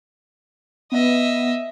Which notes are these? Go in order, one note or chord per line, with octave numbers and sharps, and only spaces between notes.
B3 D#5 E5